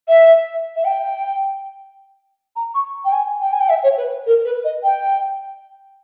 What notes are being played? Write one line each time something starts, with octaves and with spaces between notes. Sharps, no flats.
E5
E5
G5
A#5
C#6
G5
G#5
G5
G#5
G5
E5
C#5
B4
A#4
B4
D#5
G5